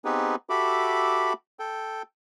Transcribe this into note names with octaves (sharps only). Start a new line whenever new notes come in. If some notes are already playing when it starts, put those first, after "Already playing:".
B3 C4 D#4 G4 G#4 B4
F#4 G4 A4 E5 B5 D6
A4 G5